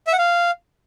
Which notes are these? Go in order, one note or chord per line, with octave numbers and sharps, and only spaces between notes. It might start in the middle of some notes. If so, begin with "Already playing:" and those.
E5
F#5
F5